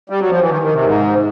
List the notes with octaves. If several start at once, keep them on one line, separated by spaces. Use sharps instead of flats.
G3
F#3
F3
E3
D#3
D#3
C3
G#2